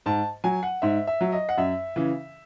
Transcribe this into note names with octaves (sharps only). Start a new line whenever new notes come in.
G#2 A5
F#3 G#5
F#5
G#2 E5
E5
F#3
D#5
F#5
F#2 E5
C#3 E3